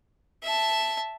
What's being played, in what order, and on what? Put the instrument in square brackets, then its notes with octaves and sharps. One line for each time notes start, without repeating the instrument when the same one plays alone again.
[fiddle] E5 A5